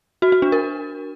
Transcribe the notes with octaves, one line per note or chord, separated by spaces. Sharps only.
F#4
F#4
D4
A#4